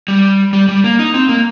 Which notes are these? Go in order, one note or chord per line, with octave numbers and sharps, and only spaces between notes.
G3
G3
G3
A#3
D#4
C4
A#3